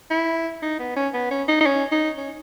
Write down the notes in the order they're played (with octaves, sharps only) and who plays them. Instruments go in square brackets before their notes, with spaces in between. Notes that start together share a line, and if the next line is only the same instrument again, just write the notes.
[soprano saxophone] E4
D#4
B3
C#4
B3
C#4
D#4
D#4
C#4
D#4
C#4